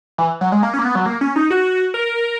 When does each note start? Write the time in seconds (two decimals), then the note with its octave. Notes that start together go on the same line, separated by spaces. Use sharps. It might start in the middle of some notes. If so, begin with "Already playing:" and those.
0.18 E3
0.41 F#3
0.52 G#3
0.63 A#3
0.74 C#4
0.79 A#3
0.85 B3
0.95 F#3
1.06 A#3
1.21 C#4
1.36 D#4
1.50 F#4
1.94 A#4